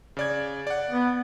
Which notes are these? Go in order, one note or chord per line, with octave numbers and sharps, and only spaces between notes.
C#3 D5 G#6
D5 F#5
B3